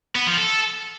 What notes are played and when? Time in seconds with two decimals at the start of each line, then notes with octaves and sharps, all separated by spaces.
0.16 B3
0.27 F3
0.38 A4